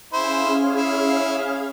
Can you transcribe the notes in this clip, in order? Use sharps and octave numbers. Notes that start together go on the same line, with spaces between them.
C#4 E4 G#4 C5 F5
E4